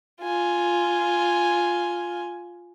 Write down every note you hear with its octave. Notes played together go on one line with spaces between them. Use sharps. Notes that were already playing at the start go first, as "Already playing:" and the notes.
F4 G#5